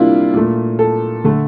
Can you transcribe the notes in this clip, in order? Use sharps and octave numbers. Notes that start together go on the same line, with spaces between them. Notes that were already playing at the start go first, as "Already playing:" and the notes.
Already playing: C3 G3 A#3 D4 E4 F4
A#2 A3
A4
D3 A3